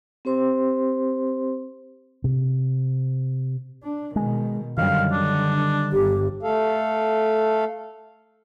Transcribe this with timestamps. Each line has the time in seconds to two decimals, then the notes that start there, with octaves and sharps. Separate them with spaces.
0.25 C4 G4 C5 C6
2.24 C3
3.84 D4
4.16 B2 D#3 G#3
4.77 F#2 D3 D#3 G3 F5
5.12 D3 D4
5.93 G1 G4
6.43 A3 A4 F5